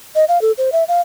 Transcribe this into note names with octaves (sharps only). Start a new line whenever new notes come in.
D#5
F5
A4
C5
E5
F5